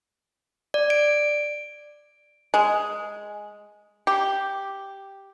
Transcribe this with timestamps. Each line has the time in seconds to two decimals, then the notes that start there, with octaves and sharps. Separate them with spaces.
0.74 D5
0.90 D7
2.54 G#3
4.07 G4